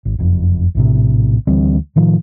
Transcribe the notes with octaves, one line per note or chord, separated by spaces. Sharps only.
G#1
F#1 F2
A#1 A2 C3
D2 E3 G3 C4
A2 D#3 F3